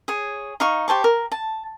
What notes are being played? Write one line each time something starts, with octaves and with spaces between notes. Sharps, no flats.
G#4 C#5
D#4 F5 C#6
G4 C5 A5 C#6
A#4
A5